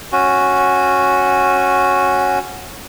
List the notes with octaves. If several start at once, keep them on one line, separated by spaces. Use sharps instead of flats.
C#4 F#4